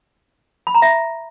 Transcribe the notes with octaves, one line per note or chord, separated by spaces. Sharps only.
B5
A#5
E5